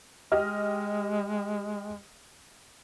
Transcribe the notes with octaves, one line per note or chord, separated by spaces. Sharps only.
G#3 G4 D#5 F6